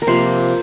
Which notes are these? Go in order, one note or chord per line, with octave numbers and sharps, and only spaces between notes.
A#4
C3 F3 A#3 C5